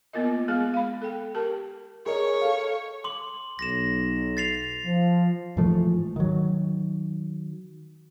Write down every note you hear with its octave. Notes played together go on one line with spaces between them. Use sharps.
A#3 B3 F4 A#4 D#5
G#3 B3 G#4 F5
F5 B5
A4 G5
G4 A#4 A5
G#4 A#4 C#5 D#5
A4 F5
C6 D6 F#7
B1 A#6 E7
A6 C7 F7
F3
G#2 E3 F3 A3
D#3 F#3